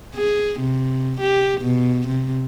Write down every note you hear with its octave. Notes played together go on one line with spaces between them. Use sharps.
G#4
C3
G4
B2
C3